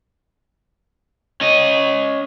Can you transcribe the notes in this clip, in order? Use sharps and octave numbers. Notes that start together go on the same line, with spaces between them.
C#4 D#5